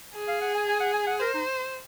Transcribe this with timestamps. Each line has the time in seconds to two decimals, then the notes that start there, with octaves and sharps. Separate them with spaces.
0.15 G#4
0.29 F5
0.41 F#5
0.55 G#5
0.68 G#5
0.80 F#5
0.94 G#5
1.07 F#5
1.20 A#4 C5
1.34 D#4